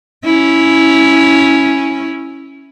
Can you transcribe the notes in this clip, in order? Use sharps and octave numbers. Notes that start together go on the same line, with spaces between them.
C#4 E4